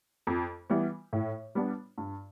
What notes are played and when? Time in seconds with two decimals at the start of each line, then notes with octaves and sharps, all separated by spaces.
0.27 F2
0.70 E3 G3 B3
1.13 A2
1.55 G3 B3 D4
1.98 G2